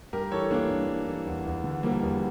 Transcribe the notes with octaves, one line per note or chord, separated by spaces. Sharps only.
G2 G4 A#4
E3 A4 C#5
E3 A#3 D4
G2
G2
E3
E2
E2
D3
F3 G3 A#3
E2